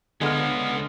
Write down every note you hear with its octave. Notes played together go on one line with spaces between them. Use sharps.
C#2 D3 G#3 B3 C#4 F5